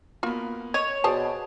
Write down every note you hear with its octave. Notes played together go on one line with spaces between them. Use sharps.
A#3 B3 F4 F#4
C#5 D#5
B2 G#4 C5 D5 G#5 A5